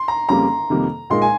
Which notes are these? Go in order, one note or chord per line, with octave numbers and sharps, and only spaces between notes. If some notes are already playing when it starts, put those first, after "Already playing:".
Already playing: C6
A#5
F2 C#3 G3 A#3 C#4 A#5
F2 C3 D#3 G3 A#3
A#2 G#3 D#4 A#4 C6
G#5